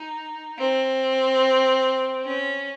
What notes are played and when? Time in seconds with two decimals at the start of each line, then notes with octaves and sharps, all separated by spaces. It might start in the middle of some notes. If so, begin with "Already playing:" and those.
Already playing: D#4
0.59 C4
2.24 C#4